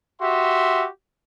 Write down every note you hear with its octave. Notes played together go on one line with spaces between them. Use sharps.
F#4 G4 E5 C6